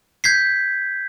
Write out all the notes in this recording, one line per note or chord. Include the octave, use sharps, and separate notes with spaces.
G6 G#6 B6 C7